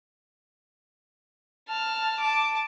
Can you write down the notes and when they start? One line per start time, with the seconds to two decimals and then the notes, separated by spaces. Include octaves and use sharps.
1.69 A5 F6
2.20 A5 D6